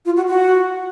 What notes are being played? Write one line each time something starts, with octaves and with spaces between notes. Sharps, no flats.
F4
F#4
F#4